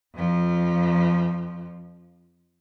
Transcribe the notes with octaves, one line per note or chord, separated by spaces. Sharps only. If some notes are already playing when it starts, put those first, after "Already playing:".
F2 F3